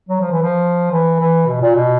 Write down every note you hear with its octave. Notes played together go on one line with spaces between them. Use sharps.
F#3
F3
E3
F3
E3
E3
B2
A#2
B2